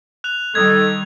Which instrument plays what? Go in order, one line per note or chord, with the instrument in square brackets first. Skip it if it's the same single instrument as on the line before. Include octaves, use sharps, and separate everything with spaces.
[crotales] F#6 F7
[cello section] D#3 G3 [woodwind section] A4 D#5 [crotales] G#6